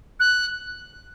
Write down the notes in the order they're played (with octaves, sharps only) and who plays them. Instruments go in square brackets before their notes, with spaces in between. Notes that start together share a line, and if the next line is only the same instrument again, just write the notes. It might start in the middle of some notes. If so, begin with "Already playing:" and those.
[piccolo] F#6